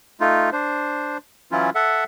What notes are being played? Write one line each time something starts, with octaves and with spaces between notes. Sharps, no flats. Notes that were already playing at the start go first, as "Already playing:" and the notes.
A3 D#4 F4
D4 C5
E3 F#3 C#4 E4 F4
A4 E5 F#5